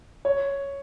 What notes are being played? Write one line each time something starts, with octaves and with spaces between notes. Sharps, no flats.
C#5